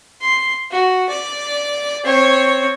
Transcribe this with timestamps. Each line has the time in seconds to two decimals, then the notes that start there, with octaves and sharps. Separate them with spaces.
0.21 C6
0.71 F#4
1.09 D5
2.04 C4 C#5